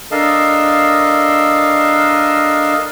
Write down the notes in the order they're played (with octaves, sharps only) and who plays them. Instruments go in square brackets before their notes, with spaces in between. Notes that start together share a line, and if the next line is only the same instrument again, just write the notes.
[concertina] D4 A4 A#4 D#5 F5 A5